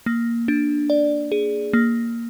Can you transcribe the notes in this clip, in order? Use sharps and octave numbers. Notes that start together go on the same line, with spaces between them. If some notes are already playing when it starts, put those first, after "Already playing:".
A#3
D4
D5
G#4
A#3